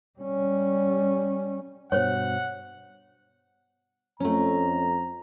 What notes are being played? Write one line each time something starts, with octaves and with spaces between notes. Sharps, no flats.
G3 C#4
G2 B2 C5 C#5 F#5
F2 A3 C#4 A#5